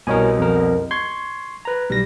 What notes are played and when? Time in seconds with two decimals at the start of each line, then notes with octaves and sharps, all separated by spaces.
0.07 C2 B2 A#4 C#5 G#5
0.38 F2 A#4
0.91 C6 C#6 G#6
1.65 B4 A#5
1.90 B1 G3 A#6